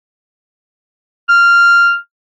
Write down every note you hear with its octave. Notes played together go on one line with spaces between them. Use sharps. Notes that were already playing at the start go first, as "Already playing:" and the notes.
F6